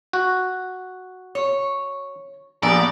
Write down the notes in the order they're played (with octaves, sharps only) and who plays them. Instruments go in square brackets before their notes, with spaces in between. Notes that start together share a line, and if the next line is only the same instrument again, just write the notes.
[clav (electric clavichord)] F#4
[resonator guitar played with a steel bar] C#5
[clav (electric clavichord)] A#1 [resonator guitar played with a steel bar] A#3 B3 G4 [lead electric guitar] D5